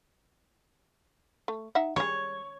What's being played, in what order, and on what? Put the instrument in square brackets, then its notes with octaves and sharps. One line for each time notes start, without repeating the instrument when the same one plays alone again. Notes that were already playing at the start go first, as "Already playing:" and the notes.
[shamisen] A3
D#4 E5 F#5
[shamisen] G3 G#4 [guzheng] C#5